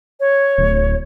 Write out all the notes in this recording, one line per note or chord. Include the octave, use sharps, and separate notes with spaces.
C#5
D1